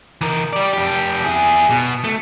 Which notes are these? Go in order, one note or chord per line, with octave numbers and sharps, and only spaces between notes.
E3 A#4
G4 D5
F2 G4
E4 G#4
B2
A3